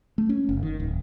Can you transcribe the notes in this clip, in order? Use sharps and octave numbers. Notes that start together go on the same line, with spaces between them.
A3
C#4
F#1
D#3
D1